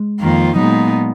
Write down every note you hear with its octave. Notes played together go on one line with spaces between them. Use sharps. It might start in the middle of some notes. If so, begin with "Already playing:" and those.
Already playing: G#3
F2 D#3 A#3 F4
A#2 F#3 G#3 B3 D#4